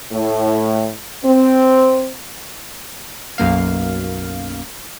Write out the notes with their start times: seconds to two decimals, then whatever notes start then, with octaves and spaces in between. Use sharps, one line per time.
0.12 A2
1.24 C4
3.38 B1 F#2 A#3 F5